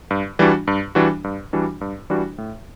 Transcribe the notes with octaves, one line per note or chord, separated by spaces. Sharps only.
G2
E3 G3 D4 F#4
G2
E3 G3 D4 F#4
G2
E3 G3 D4 F#4
G2
E3 G3 D4 F#4
A2